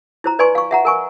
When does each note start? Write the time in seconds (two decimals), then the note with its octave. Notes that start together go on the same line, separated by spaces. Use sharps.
0.24 E4 C5 A#5
0.39 B4 D5 D#5 G#5 C6 C#6
0.55 F5 C#6
0.71 E5 F#5 A#5
0.85 A#4 G#5 C#6